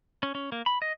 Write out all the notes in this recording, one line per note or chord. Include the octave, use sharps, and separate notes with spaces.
C#4
C#4
A#3
B5
D#5